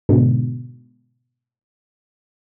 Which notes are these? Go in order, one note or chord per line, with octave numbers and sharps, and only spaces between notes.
G#2 B2 D3